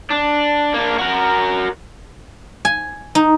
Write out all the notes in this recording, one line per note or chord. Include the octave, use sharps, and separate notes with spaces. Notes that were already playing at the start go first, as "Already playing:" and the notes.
D4
A#3 D4
F#4 A#4
G#5
D#4